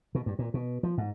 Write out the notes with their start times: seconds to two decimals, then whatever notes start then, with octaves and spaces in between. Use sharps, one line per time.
0.15 B2
0.26 G2
0.39 A#2
0.54 B2
0.83 F3
0.98 G#2